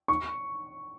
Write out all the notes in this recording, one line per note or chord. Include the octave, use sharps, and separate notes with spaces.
C#6